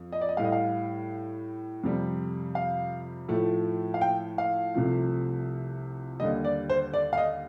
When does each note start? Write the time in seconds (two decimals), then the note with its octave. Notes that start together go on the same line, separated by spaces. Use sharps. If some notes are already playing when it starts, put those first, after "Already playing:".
Already playing: F2
0.12 D#5
0.21 D5
0.29 D#5
0.37 A2 G3 F5
0.45 D#5
0.52 F5
1.83 F2 C3 G3
2.55 F5
3.28 A2 F3 A3
3.94 F5
4.01 G5
4.38 F5
4.74 C2 C3 F3 A3
6.20 D#2 D3 G3 D#5
6.45 D5
6.70 C5
6.94 D5
7.13 F5
7.18 D#5